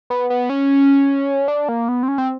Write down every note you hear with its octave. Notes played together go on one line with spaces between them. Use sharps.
B3
B3
C#4
D4
A#3
B3
C4
C#4
C4